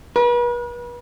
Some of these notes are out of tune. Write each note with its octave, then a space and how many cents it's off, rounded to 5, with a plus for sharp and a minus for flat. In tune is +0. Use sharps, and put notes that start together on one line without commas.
B4 -40